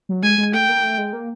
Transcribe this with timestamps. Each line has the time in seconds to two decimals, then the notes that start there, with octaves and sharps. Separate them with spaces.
0.09 F#3
0.23 G#3 G#5
0.38 G#3
0.53 A3 G5
0.69 A#3
0.83 A3
0.98 G#3
1.13 A#3